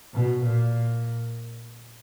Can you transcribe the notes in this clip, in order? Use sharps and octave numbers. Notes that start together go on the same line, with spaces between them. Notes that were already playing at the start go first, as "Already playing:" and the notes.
B2
A#2